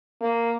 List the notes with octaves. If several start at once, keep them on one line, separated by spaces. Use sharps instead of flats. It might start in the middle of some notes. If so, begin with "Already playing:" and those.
A#3